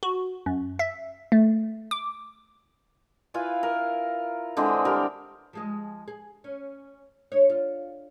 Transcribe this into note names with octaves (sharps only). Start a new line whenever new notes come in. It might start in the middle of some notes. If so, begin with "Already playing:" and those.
F#4
F#2
E5
A3
D6
E4 F4 B4 G#5
A#4
D3 E3 G#3 C4
G3 G4 A#4
F3 G#3 D#5
G#4
C#4
C#5
F4